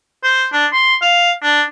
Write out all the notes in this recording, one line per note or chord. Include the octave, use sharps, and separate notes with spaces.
C5
D4
C6
F5
D4